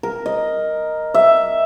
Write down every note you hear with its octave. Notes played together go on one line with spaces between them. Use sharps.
A#4
D#5
E5